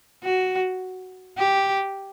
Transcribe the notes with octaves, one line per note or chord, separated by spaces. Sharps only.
F#4
G4